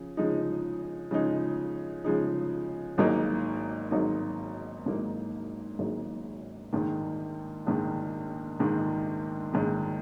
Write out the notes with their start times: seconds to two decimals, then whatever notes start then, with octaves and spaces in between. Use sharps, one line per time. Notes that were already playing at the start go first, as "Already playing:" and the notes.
Already playing: C#3 F3
0.17 C#3 F3 G#3 D#4
1.11 C#3 F3 G#3 D#4
2.04 C#3 F3 G#3 D#4
2.98 G#1 G#2 F#3 A#3 D#4
3.91 G#1 G#2 F#3 A#3 D#4
4.85 G#1 G#2 F#3 A#3 D#4
5.79 G#1 G#2 F#3 A#3 D#4
6.73 A#1 G#2 D#3
7.67 A#1 G#2 D#3
8.59 A#1 G#2 D#3
9.53 A#1 G#2 D#3